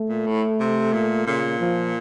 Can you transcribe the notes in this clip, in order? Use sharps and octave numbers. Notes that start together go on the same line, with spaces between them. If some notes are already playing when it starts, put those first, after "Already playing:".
Already playing: A3
A#2
A2
C3
A#2
A#2 C#3
F3